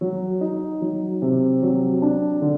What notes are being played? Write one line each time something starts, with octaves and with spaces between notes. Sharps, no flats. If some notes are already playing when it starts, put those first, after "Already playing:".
F#3
D#4
F#3
C3
F#3
D4
D3